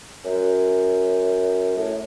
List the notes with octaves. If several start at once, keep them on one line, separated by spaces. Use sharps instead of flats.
F#2
A2